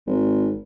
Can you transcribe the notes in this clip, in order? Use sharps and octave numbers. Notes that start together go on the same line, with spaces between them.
G#1